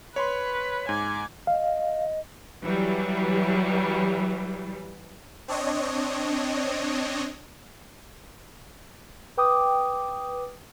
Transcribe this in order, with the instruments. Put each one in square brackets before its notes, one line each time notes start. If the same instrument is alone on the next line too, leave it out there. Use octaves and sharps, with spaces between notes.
[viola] B4 [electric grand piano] C#5 B5 C6
[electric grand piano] G#2 [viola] G#5 D6
[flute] D#5 [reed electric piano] F5
[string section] E3 F#3 G3
[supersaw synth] C4 D4 C#5 D#5
[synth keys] B4 G5 D6 D#6